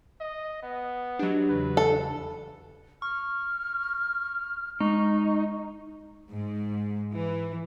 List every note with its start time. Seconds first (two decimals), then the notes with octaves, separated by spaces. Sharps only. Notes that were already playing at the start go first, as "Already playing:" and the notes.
0.20 D#5
0.63 B3
1.19 F#3 D4 G4 B4 D#5
1.49 E2 C#3 E3 B4
1.77 A4
3.02 C#6 F6
4.81 G#3 D#4 C#6
6.31 G#2
7.14 E3